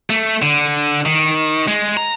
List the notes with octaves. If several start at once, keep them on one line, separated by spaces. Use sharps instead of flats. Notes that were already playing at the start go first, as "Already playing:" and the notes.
A3
D3
D#3
G#3
A#5